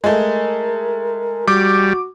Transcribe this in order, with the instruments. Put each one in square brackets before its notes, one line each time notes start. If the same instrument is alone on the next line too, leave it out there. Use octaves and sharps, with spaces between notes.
[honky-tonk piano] G#3 A3 [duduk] A#4
[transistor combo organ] G3 [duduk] F#4 [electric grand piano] D6